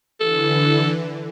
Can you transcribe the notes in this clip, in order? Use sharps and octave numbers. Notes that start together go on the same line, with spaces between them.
D3 E3 A4